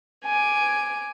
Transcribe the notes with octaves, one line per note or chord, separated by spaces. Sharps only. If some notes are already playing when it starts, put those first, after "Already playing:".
G#5 D6